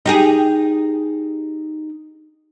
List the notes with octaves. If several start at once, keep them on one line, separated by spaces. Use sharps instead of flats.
D#4 G4 G#4